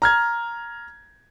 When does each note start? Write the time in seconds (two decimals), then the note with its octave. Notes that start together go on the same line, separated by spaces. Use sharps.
0.02 A#5 F6 G#6